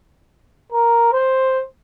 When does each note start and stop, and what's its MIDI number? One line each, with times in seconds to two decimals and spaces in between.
0.72 1.13 70
1.13 1.63 72